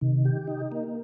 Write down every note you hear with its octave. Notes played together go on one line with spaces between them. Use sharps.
C3 D#3
G4
D#4
A#3